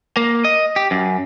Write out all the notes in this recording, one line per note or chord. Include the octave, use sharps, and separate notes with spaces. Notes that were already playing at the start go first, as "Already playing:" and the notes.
A#3
D#5
G4
F#2